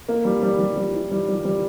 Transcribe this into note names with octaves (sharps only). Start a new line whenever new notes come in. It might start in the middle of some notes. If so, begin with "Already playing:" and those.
A#3
G3
G3
G3
G3
E4
G3
G3
G3